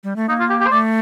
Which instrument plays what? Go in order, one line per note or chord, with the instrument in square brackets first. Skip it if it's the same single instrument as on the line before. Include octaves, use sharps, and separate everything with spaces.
[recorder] G3
A3
[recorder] A#3 [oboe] D#4
[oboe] F4
G4
G4
C5
[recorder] A3 [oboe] D5